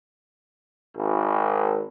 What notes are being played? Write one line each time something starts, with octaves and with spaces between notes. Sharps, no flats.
G#1